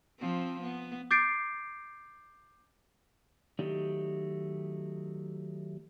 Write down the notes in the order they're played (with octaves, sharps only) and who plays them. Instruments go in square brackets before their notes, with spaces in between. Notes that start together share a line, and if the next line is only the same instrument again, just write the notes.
[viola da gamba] F3 C4
B3
[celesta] D6 G6 A6 C7 D7
[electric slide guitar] D#3 F#3 A3 D#4 G4 D5